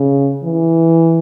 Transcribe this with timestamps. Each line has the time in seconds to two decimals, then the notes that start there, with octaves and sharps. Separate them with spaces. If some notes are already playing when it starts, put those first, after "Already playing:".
Already playing: C#3
0.44 E3